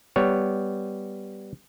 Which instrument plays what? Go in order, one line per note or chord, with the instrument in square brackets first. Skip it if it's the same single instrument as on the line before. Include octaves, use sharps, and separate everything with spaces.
[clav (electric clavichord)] G3 B3 C#5